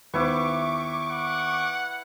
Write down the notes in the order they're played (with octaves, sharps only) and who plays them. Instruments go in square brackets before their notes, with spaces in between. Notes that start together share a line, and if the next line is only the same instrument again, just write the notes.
[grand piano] D#2 B3 C5 [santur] E4 B4 [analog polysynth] C#6 D6
[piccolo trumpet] F#5